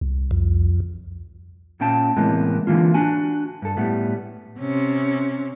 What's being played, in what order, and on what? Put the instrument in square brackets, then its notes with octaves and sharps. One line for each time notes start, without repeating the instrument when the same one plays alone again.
[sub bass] C2
[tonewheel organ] F2
[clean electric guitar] A#2 C#4 G5 A5
A2 C3 E3 G#3 A#3 B3
D3 E3 A#3 F4
D4 F#4 G#5
G2 A4
A2 G3 B3
[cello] C3 C#4